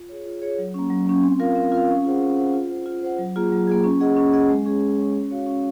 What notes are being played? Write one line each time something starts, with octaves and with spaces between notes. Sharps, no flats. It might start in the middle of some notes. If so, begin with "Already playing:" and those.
Already playing: F4
G#4 C#5
F4
G#4 C#5
F#3
A#3 C#4
F#3
A#3 C#4
C4
F4 A#4 F5
C4
F4 A#4 F5
C#4
F4 G#4 C5 F#5
C#4
F4 G#4 C5 F#5
F4
C5 F#5
F4
C5 F#5
F#3
A#3 F4 G#4
F#3
A#3 F4 G#4
C#4
G#4 D#5 F#5
C#4
G#4 D#5 F#5
G#3
C#4 G#4 C#5
G#3
C#4 G#4 C#5
C#4
F#4 C#5 F5
C#4